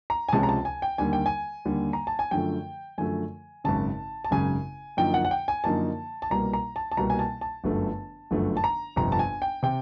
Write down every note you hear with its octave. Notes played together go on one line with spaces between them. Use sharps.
A#5
G#5
C#2 C3 F3 G#3 C#4 A5
A#5
A5
G#5
G5
D#2 D3 G3 A#3 G#5
G5
G#5
D#2 D3 G3 A#3
A#5
A5
G#5
F#2 D3 F3 A3 G5
F#2 D3 F3 A3 G#5
G#1 F#2 C#3 A5
A5
G#1 F#2 C#3 G#5
F#2 D3 F3 A#3 D#4 G5
F#5
F#5
G5
G#5
F#2 D3 F3 A#3 D#4 A5
A5
C2 B2 G3 A#3 A#5
A#5
A5
A5
C2 B2 G3 A#3 A#5
G#5
A5
A5
G1 F#2 D3 F3 A3
G1 F#2 D3 F3 A3
A5
A#5
G1 F2 C3 A#5
A5
G#5
G5
C3 G5